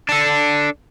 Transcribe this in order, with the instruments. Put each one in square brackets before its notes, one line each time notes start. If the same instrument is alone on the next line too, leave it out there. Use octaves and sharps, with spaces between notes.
[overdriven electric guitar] D4 A4